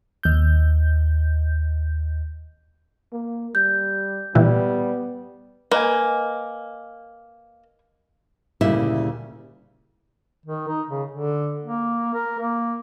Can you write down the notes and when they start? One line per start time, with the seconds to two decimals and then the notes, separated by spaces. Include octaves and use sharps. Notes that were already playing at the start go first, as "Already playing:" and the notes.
0.23 D#2 G6
3.12 A#3
3.55 G3 G6
4.35 A#2 E3 G3 B3
5.71 A#3 B4 D#5 G#5
8.61 D2 A#2 C#3 G3 E4 E5
10.46 D#3
10.68 D#4
10.89 C#3
11.11 D3
11.63 A#3
12.14 A#4
12.39 A#3